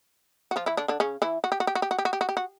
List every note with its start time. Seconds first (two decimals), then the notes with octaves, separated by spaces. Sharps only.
0.51 F#4
0.56 F3 F4
0.66 E3 E4
0.77 D3 D4
0.88 D3 D4
1.00 C#3 C#4
1.22 E3 E4
1.44 F#4
1.52 G4
1.60 F#4
1.67 G4
1.75 F#4
1.82 G4
1.91 F#4
1.98 G4
2.05 F#4
2.13 G4
2.21 F#4
2.29 G4
2.37 F#4